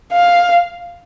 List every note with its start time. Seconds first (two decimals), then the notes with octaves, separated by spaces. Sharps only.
0.13 F5